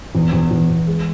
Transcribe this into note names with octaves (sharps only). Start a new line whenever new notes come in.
E2
E2
E2
E2
G#3